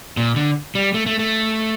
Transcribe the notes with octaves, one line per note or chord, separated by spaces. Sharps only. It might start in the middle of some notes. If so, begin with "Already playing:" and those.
A#2
D3
G3
A3
A3
A3